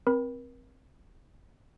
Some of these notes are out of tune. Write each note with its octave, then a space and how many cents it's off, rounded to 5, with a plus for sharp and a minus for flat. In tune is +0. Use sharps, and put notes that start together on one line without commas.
C4 +0 A#4 +40 B5 +0